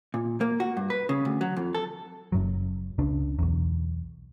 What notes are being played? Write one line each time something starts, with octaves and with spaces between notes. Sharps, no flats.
A#2
A#3
F#4
G2
B4
C#3
D2
F#3
F2
A4
F#1 F#2 F#3
C#2 C#3 D4
B1 E2